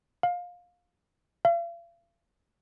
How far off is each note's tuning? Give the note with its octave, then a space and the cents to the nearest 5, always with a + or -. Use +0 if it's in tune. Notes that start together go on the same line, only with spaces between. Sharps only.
F5 +20
F5 -45